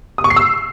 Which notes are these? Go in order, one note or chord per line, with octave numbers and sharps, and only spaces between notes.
D#6
C#6
C7
E6